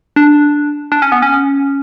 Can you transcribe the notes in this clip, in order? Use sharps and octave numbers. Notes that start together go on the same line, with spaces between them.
D4
D4
C#4
B3
C#4